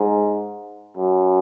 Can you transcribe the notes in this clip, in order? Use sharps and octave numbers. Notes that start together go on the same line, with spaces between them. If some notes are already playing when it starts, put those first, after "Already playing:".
Already playing: G#2
F#2